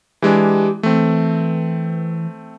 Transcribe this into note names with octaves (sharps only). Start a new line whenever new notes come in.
E3 G#3 D4 G4
E3 A3 C4